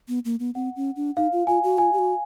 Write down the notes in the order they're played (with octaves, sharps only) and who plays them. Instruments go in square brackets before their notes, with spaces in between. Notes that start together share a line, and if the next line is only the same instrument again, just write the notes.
[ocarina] B3
A#3
B3
[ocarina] C4 [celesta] F#5
[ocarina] C#4
D4
[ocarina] D#4 [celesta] F5
[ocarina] F4
[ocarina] F4 [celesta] G#5
[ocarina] F#4
[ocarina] F4 [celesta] G#5
[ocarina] G4
F#4